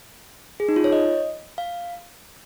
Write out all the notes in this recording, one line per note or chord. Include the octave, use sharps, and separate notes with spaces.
G#4
D#4
F4
C#5
D#5
F5